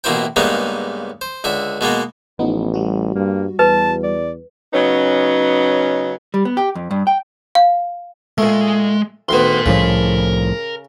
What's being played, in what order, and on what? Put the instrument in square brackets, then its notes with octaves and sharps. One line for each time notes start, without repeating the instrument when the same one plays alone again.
[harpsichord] A1 B2 A#3 E4 C5 G5
G2 C#3 G#3 A#3 B3 D#4
C5
C#2 D3 E5
B2 G#3 A#3 B3
[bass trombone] A1 [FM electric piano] F3 B3 D#4
[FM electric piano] G3 F#4
[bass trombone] G2 [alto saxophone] A#3
[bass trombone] E2 [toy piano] B4 [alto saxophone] A5
[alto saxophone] D5
[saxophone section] C#3 F#3 B3 C#4 D#4
[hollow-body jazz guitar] G3
B3
G4
F2
G2
G5
[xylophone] F5
[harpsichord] A#2 A3 [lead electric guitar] G#3
[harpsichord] D2 D#3 B3 [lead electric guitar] A#4 C6
[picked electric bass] C2 A2 F3 [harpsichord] C#3